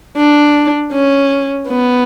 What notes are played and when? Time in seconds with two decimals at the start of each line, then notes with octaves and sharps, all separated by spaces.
0.17 D4
0.93 C#4
1.68 B3